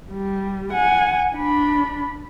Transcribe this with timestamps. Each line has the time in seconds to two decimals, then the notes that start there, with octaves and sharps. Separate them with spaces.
0.12 G3
0.73 F#5 G#5
1.36 D4 B5